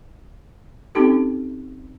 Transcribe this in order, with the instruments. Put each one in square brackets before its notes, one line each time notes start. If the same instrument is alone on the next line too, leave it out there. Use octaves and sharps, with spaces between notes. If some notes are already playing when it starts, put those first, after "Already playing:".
[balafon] C4 C#4 D#4 G4 A4